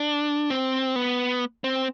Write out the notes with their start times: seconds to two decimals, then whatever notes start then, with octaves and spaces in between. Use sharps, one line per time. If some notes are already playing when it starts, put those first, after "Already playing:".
Already playing: D4
0.50 C4
0.96 B3
1.64 C4